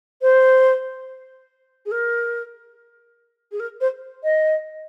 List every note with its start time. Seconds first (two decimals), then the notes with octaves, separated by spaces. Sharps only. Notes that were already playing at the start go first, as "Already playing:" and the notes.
0.21 C5
1.85 G#4
1.91 A#4
3.51 G#4
3.59 A#4
3.80 C5
4.23 D#5